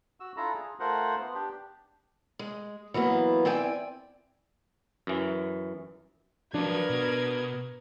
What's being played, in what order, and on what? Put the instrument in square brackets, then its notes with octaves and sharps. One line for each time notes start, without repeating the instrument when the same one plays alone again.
[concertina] F#4 E6
D4 E4 F4 A4 A#5
G#4
A3 F4 A#4 C5 F#5
B3
D4 G4
[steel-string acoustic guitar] G#3
E3 F#3 A#3 B3
C4 E4 D5 G5 G#5
[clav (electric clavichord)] F#2 E3
[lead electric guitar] F3 F#3 [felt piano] D4 [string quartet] A#4 B4 G#6
[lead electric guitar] B2